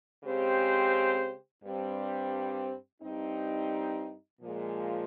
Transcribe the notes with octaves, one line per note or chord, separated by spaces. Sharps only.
C#3 G#3 C4 G4 C5
G2 G3 C4
G2 G3 C4 D#4
A#2 F3 G#3